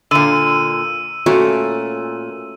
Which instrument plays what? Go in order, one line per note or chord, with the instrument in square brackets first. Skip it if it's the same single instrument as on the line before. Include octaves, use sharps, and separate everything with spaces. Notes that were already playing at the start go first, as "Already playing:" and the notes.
[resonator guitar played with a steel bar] A#2 D3 [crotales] E6 D#7
[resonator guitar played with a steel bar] A#2 [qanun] A3 C#4 F#4